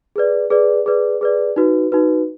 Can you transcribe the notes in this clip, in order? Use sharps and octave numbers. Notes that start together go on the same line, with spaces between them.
G#4 B4 D5
G#4 B4 D5
G#4 B4 D5
G#4 B4 D5
D#4 F#4 B4
D#4 F#4 B4